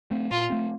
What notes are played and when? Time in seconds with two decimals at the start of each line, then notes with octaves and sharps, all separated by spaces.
0.11 A3 C4
0.31 A#2 F4
0.50 A3 C4